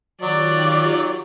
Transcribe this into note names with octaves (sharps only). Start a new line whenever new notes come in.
D#3 F#3 F4 G4 D5